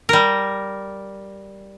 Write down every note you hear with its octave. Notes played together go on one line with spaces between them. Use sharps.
G3 A#4